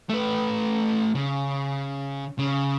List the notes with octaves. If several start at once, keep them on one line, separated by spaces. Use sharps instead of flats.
A3 B4
C#3
C#3